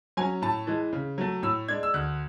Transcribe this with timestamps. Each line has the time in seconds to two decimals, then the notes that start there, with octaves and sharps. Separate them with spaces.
0.17 F#3 G#5
0.21 C#4
0.42 A2 A5
0.67 E3 G#3
0.93 C#3
1.18 F#3 A3
1.43 A2 E6
1.68 G#3 D4 G#6
1.83 E6
1.94 D2 F#6